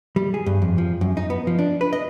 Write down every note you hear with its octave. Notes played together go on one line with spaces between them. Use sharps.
G3
G#4
G2
F2
F3
F#2
D#4
B3
F3
D4
B4
D#5